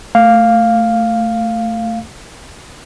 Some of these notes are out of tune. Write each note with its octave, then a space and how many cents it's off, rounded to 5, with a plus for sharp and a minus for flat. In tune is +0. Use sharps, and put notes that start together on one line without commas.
A3 +10 F5 +0